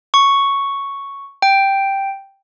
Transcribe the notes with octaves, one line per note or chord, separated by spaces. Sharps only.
C#6
G5